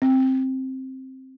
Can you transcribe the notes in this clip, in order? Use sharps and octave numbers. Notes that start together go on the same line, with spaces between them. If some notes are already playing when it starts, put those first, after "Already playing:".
C4